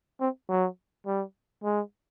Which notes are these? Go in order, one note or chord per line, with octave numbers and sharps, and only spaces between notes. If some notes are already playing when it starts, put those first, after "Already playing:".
C4
F#3
G3
G#3